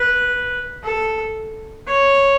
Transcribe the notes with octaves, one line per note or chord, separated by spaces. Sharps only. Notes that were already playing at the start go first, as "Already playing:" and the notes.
Already playing: B4
A4
C#5